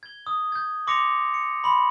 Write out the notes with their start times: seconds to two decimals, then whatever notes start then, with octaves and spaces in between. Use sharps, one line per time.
0.03 G#6 G7
0.27 D#6
0.52 G6 G#6
0.87 C6 D6 A#6 C#7 F7
1.34 C#7
1.64 B5 C6 F#7